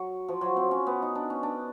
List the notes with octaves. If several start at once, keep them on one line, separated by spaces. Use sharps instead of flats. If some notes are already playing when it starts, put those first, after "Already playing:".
Already playing: F#3
F3
F#3
C4
C#4
B3
D#4
D4
C#4
D4